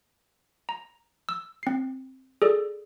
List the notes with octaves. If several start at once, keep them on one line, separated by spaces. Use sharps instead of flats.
A#5
E6
C4 C7
G#4 A4 D5